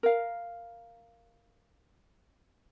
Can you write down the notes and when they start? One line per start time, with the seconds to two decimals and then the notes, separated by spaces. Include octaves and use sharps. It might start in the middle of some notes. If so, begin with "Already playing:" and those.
0.03 A#4 F5